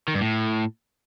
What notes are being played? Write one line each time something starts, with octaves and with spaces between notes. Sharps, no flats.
D#3
G2
A2